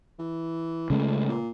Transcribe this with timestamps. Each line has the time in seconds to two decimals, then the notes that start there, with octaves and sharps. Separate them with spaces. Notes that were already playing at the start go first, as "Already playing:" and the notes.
0.19 E3
0.90 C#2 C#3 G#3 A3
1.29 A#2